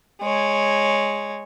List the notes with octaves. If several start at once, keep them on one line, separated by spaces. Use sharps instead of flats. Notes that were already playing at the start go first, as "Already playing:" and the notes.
G#3 C#5